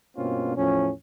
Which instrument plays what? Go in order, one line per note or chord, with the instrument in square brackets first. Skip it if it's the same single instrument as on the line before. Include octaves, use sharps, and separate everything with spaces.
[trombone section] G2 B2 A#3 C4 C#4 F4
E2 A2 F3 C#4